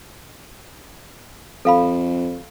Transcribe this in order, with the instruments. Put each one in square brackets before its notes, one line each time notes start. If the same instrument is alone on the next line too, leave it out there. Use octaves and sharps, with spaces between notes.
[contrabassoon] F2 [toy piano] A4 F5 B5